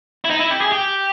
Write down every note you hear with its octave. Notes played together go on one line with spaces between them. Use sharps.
E4
D#4
E4
G4
G#4
G4